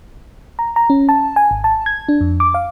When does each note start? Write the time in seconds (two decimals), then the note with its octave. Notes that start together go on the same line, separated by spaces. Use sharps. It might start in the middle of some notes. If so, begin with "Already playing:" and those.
0.59 A#5
0.76 A#5
0.90 C#4
1.09 A5
1.36 G#5
1.51 G#1
1.64 A5
1.86 G#6
2.09 D4
2.21 F2
2.40 D6
2.54 F5